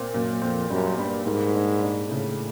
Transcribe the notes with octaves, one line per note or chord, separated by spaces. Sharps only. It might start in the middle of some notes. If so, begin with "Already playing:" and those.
Already playing: A#2 C4
F#2 A#2
F2 C4
F#2 G3
G2 G3
G#2 A#3
D4
D4
A2 C#3